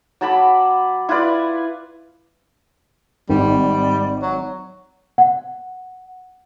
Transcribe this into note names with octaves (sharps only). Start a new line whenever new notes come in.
F#3 A5 B5 D6
E4 F4 B4 D5
G#1 G3
F#3
F#5